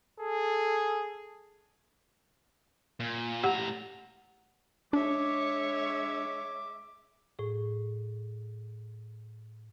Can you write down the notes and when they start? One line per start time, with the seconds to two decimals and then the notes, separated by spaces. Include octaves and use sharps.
0.20 G#4 A4
3.00 A#2
3.43 A2 G4 F#5 A#5
4.93 G#3 D4 C#5 E5 D6
7.39 A2 G#4